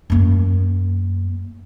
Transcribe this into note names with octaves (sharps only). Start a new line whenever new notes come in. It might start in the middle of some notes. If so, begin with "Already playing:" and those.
F#2 A#3